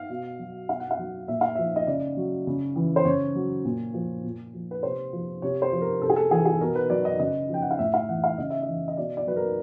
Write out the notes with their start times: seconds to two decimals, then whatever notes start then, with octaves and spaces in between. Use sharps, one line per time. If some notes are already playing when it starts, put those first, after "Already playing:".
Already playing: F5
0.10 B2
0.39 F#3
0.68 B2 F5
0.80 F#5
0.91 F5
0.99 F#3
1.28 A#2 E5
1.41 F5
1.55 F3 E5
1.76 D#5
1.87 C#3 D5
2.17 F#3
2.47 C#3
2.76 E3
2.96 C5
3.05 C#3 C#5
3.35 F#3
3.65 A#2
3.94 F3
4.24 A#2
4.54 F3
4.71 B4
4.83 C3 C5
5.13 F3
5.42 C3 C#5
5.62 C5
5.72 F3
5.81 A#4
6.02 C3 A4
6.10 G#4
6.16 A4
6.31 E3 G#4
6.46 G#4
6.61 B2 A#4
6.75 B4
6.90 F#3 D5
7.05 D#5
7.19 C#3 D#5
7.49 F3 G5
7.62 F#5
7.71 F5
7.79 A2 E5
7.94 F5
8.09 E3 F#5
8.24 F5
8.38 C#3 D#5
8.50 E5
8.62 D#5
8.68 E3
8.88 D#5
8.97 B2 D5
9.17 D5
9.27 F#3 B4
9.36 A#4